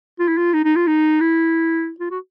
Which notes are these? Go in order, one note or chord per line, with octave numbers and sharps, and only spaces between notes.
F4
E4
F4
D#4
D#4
F4
D#4
E4
F4
F#4